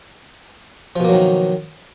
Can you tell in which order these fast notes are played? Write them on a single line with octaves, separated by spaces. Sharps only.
F3 B2 A#3 F#3 D#3